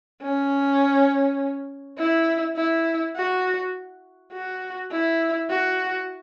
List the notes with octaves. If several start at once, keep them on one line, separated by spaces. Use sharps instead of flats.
C#4
E4
E4
F#4
F#4
E4
F#4